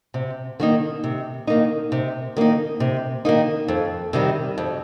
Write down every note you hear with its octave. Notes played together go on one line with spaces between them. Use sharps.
C3
D#3 A#3 D#4
C3
D#3 A#3 D#4
C3
D#3 A#3 D#4
C3
D#3 A#3 D#4
F2
C3 D#3 G3
F2